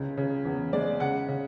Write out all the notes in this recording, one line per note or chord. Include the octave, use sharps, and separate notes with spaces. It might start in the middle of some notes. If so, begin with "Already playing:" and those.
Already playing: C#2 C#3
C#3
E2
G#3 D5
C#3 F#5
C#3